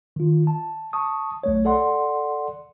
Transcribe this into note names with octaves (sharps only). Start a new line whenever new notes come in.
D#3 F4
A5
A5 C#6 D#6
B1 A3 C#5
A4 D5 F#5 C6